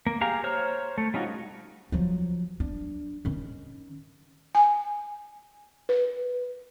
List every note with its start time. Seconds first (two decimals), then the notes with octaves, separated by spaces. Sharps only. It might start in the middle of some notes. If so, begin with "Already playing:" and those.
0.07 A#3
0.21 G4 G#4 F5 A#5
0.44 C5 C#5 A#5 F6
0.98 A3
1.14 G3 C#4 D#4 F4 F#4
1.92 F3 F#3
2.60 D4
3.25 D#3 C#4
4.55 G#5
5.89 B4